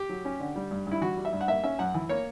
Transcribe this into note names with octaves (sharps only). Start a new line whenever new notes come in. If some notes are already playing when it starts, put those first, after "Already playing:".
Already playing: G4
F#3
C#4
D3
G3
G2
G2 E4
E3 F#4
G3
E5
G2
F#5
A#3 E5
C#4 E5
F#2 F#5
E3
A#3 C#5